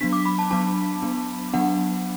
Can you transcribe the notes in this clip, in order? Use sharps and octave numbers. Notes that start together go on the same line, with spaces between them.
F#3 B3 D4 B6
D6
B5
A5
F#3 B3 D4 A5
F#3 B3 D4
F#3 B3 D4 F#5